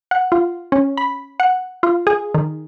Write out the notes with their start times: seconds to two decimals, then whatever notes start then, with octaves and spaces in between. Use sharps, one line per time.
0.11 F#5
0.32 F4
0.72 C#4
0.97 B5
1.40 F#5
1.83 F4
2.07 G#4
2.34 D#3